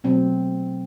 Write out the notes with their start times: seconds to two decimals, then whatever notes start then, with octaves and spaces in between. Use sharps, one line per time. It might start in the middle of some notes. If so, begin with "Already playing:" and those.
0.04 B2 F#3 A3 C4